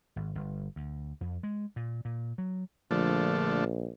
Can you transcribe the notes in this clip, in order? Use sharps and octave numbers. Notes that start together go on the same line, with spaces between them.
G#1
G1
D2
F2
G#3
A#2
A#2
F#3
A#1 D3 F3 A3